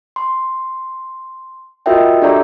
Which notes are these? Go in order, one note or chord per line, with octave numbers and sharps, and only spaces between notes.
C6
F4 F#4 A#4 D#5 E5 G5
D4 G4 A4 D5 E5 A#5